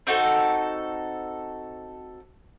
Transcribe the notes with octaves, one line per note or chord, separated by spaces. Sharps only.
C4 D#4 F#4 A4